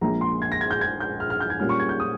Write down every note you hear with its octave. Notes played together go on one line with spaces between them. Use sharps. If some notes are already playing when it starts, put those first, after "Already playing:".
A#1 A#2 G#3 A#5
C6
G#6
A#6
G#6
G6
G#6
G6
F6
F6
G6
G#6
A#2 G3 A#3 C#4 F4 F6
C#6
G#6
G6
D#6